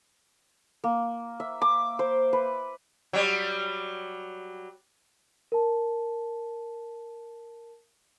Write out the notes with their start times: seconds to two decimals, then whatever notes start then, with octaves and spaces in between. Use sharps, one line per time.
0.84 A#3
1.40 E5
1.62 D6
1.99 C5
2.33 B4
3.13 F#3 G3
5.52 A#4 A5